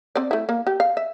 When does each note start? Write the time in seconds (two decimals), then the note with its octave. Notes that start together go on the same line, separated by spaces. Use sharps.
0.15 C4 D5
0.31 A3 E4
0.49 A#3
0.67 G4
0.80 F5
0.97 E5